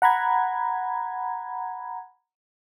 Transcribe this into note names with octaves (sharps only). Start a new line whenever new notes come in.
F#5 A#5 B5 G#6